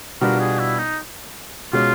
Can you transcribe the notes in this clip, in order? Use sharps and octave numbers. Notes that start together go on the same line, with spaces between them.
B2 G3 B3 D4 F4 A#4
G#4
E4
D#4
B2 G#3 C#4 F4